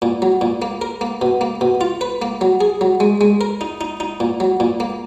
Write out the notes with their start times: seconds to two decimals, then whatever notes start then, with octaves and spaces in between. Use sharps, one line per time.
0.02 A#2
0.22 F#3
0.41 A#2
0.62 A#3
0.82 A#4
1.01 A#3
1.22 B2
1.41 A#3
1.61 B2
1.81 F4
2.01 B4
2.22 A#3
2.41 F#3
2.61 G#4
2.81 F#3
3.00 G#3
3.21 G#3
3.41 A#4
3.61 D#4
3.81 D#4
4.00 D#4
4.20 A#2
4.40 F#3
4.60 A#2
4.80 A#3